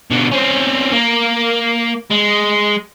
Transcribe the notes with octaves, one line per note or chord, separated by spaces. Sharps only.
B2 D3
C4 C#4
A#3
G#3